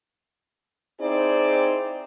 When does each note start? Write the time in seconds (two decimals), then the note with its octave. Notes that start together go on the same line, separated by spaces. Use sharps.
1.00 C4 D#4 E4 G#4 C5 D5